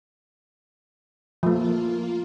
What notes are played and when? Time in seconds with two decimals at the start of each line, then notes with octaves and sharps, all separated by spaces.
1.43 F3 A3 A#3 F4